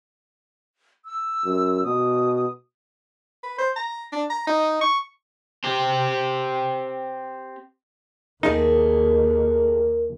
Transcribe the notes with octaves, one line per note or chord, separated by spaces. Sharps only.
E6
F#2
B2 D#6
B4
C5
A#5
D4
A#5
D#4
C#6
C4 G4
D#2 D#3 A3 D#4 G#4 A#4